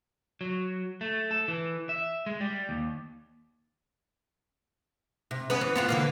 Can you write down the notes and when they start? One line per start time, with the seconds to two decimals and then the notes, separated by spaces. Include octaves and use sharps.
0.41 F#3
1.01 A3
1.31 A4
1.48 E3
1.89 E5
2.26 G#3
2.40 G3
2.69 D#2
5.31 C3
5.50 B3 C#4 B4
5.61 E3
5.76 B3 C4 F4
5.89 D3 E3 A#3